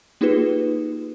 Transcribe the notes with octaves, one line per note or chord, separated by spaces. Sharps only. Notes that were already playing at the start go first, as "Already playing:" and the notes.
A#3 D#4 F4 G4 G#4 B4